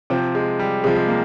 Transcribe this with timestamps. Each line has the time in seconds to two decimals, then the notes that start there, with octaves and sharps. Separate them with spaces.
0.10 C3 F3 C4
0.35 G#3
0.59 G3
0.84 C3 F3 G#3
0.96 G#3
1.08 A#3